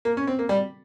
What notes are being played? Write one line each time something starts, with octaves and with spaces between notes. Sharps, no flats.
A#3
C#4
C4
A#3
G3